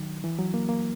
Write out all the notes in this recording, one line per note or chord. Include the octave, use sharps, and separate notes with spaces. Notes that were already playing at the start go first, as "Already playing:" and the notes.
Already playing: D#3 F#3
E3
F#3
A#3
A#3